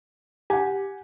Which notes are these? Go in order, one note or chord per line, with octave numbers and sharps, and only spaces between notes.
G4 F#5 G#5